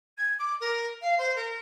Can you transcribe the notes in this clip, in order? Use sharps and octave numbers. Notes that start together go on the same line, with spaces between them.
G#6
D6
A#4
F5
C5
A#4